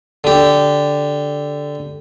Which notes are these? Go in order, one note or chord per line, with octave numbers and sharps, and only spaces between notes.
D3 G4